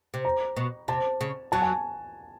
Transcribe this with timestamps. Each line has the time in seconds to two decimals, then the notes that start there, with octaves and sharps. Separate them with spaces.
0.14 C3
0.25 A#5
0.57 B2
0.88 C3 A5
1.21 C#3
1.52 F#3 A5
1.62 G#5